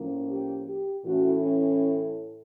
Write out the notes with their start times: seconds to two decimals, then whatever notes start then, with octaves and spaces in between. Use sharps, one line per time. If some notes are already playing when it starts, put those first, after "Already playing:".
Already playing: A2 F3 A#3 C#4
0.30 G4
0.68 G4
1.05 A2 E3 A3 C#4 F#4
1.41 C#4